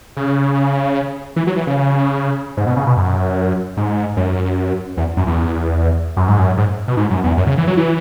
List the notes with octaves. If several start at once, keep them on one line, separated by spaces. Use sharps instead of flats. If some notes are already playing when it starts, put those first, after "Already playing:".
C#3
E3
F#3
E3
C#3
G#2
B2
C#3
B2
F#2
G#2
F#2
E2
F#2
E2
F#2
G#2
F#2
G#2
B2
G#2
F#2
E2
F#2
C#3
E3
F#3
E3